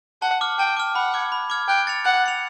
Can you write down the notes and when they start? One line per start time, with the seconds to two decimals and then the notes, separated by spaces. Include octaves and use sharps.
0.22 F#5 A5
0.41 D6 F6
0.59 G5 A5
0.77 D6 F6
0.95 F#5 B5
1.14 D6 F6 G#6
1.32 B5
1.50 D6 F6 G#6
1.68 G5 F#6
1.87 A6 C#7 F7
2.04 F#5 F#6
2.24 A6 C#7 F7